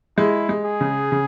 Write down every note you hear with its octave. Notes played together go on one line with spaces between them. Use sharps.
G#3 E4
G#3
G#4
C#3
C#3